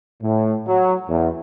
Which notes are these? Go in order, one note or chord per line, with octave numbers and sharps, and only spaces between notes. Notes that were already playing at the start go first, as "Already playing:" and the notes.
A2
F#3
E2